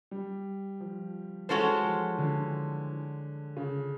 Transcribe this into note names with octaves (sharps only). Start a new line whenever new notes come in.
G3
F3
E3 G#3 C#4 F#4 A4 C5
F3
D3
C#3